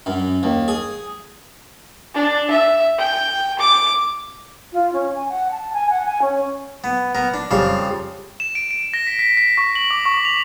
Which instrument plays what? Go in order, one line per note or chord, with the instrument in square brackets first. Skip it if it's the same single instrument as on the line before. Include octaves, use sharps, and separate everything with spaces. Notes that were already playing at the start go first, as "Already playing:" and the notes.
[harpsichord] F#2
D#2
G#4
[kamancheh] D4
E5
G5
D6
[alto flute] F4
C#4
G#5
F#5
A5
G#5
F#5
G#5
C#4
[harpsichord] B3
B3 A#4
D4
F2 C#3 G3 F5 A5
[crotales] E7
D7
D7
A#6
B6
B6
B6
C#6
F#7
D6
C#6
F7